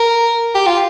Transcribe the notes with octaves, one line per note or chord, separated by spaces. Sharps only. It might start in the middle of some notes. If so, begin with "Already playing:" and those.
Already playing: A#4
G4
F4